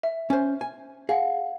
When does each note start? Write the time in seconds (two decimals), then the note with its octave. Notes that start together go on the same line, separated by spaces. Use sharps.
0.03 E5
0.30 C#4 C5
0.61 G#5
1.09 G#4 F5 F#5